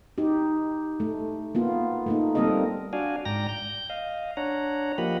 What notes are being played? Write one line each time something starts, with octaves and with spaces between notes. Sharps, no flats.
D#4 G4
A3
A#3 B3 F4
A3 A#3 D#4
G3 A#3 C4 A4 A#4 D#5
D4 F#4 D5 F5 G#5
G#2 D5 G5 A#5 A#6
G6
D#5 F5
D4 C#5 F#5 A#5
F3 A#3 G4 D#5 F#5 B5